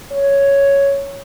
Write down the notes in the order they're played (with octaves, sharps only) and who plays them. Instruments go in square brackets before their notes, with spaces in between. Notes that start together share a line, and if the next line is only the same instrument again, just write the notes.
[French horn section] C#5